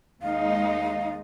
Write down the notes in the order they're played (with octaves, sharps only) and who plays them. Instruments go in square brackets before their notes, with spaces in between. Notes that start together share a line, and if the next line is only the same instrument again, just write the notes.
[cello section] D#2 G#3 D#4 [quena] F5